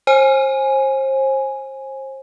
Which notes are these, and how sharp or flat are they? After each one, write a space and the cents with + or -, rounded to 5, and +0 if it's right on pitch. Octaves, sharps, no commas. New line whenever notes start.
C5 +35 G#5 +0